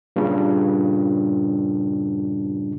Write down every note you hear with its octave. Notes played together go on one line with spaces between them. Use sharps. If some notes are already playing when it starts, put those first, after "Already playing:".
G2 A#2 C#3